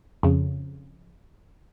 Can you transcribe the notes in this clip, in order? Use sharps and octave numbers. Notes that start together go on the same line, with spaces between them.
F2 C#3